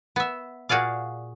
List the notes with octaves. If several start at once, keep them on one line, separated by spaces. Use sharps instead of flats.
B3 E5
A#2 F#4 G#4 D5 F5